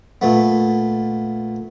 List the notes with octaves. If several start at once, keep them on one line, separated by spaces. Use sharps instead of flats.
A#2 A3 B3